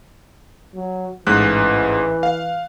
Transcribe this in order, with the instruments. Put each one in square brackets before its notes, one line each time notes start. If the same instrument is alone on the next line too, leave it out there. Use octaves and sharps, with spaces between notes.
[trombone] F#3
[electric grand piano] A1 G#2 F#6 [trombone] E3
[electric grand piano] F5